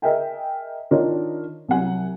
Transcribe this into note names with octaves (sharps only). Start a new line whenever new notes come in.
G#4 A#4 D#5 E5 G5 G#5
D#3 D4 F4 A#4 C#5 D#5
C2 F#3 F#5 G#5